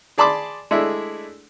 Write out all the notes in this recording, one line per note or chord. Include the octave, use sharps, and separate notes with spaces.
G#4 D5 A5 B5 C6 D6
G#3 A3 D4 E4